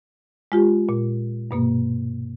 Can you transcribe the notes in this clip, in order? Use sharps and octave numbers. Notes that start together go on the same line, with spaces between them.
G#3 F4 G4
A#2
G2 B2 A#3